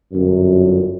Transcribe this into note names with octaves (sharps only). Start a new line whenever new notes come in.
G1 F#2